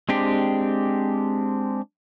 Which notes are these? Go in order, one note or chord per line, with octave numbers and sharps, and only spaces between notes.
G#3 C4 D4 G4